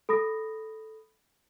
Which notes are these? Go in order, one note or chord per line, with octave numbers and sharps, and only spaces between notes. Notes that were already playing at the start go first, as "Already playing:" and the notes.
A4 B5 D#6 A#6